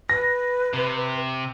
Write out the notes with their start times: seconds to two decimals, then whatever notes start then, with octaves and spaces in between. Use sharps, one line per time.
0.09 B4 A#6
0.74 C3